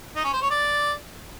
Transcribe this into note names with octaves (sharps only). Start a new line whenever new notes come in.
D#4
C#4
C5
C#5
D5